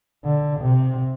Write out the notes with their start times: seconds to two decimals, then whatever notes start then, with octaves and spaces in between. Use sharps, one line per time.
0.25 D3
0.61 C3